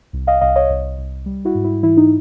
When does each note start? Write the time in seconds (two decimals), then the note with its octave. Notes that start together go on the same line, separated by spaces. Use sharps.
0.13 C2
0.27 D#5 F5
0.41 C2 D#5 F5
0.56 C#5 D#5
0.70 C2
0.98 C2
1.26 G3
1.45 E4 F#4
1.55 G#2
1.64 E4
1.83 E3 E4
1.97 D#4